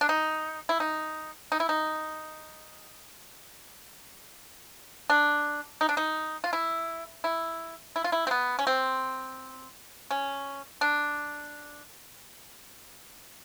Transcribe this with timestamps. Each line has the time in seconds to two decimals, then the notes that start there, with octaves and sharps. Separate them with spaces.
0.01 D4
0.09 D#4
0.69 E4
0.80 D#4
1.52 D#4
1.60 E4
1.69 D#4
5.10 D4
5.81 D#4
5.89 D4
5.97 D#4
6.44 F4
6.53 E4
7.24 E4
7.96 E4
8.04 F4
8.12 E4
8.27 C4
8.31 B3
8.59 C#4
8.67 C4
10.11 C#4
10.81 D4